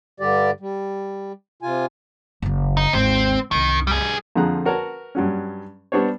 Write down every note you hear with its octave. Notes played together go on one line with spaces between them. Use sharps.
G2 D3 G3 G4 D5
G3
C3 F4 G#5
F#1 F#2
D#4
G#1 D#2 C4
C2 F#2 D#3
G3 G#4
F2 D3 F3 G#4 A#5 F#6
F#4 A#4 B4 C#5 A5
G2 F#3 C#4
G3 B3 D4 C5 C#5